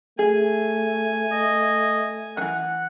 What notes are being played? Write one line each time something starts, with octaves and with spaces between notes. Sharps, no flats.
A3 G#4 G#5
D#5
D#3 E3 F#5